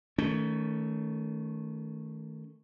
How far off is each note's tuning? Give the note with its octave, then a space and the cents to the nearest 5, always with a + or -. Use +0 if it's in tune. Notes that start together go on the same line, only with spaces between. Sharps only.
D#3 +15 A3 +0 C#4 +20